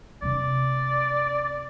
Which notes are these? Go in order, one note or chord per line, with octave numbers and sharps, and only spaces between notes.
C3 C4 D5